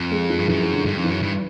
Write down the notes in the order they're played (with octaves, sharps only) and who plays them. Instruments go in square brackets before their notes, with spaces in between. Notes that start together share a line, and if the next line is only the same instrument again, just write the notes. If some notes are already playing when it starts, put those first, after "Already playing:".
Already playing: [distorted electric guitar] F2
[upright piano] G#3
F3
[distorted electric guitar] G2
[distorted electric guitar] F#2 [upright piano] E3
[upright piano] E3
D3
[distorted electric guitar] G2 [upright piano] D#3
[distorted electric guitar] F2
[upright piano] E3
[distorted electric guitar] F#2
G2